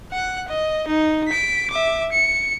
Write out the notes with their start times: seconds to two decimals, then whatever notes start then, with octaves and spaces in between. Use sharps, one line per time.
0.12 F#5 F#6
0.49 D#5
0.87 D#4
1.28 B6 D7
1.70 E5 D6
2.12 C#7